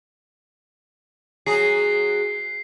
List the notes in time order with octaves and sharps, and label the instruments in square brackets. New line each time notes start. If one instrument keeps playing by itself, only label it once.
[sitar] F#3 G#4 [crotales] C7